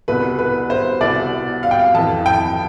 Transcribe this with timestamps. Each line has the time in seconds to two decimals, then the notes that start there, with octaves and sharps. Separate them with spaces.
0.08 C2 B2 B4
0.39 B4
0.70 C5
1.01 C2 B2 D5
1.63 F5
1.71 G5
1.79 F5
1.94 F2 E3 A5
2.26 G5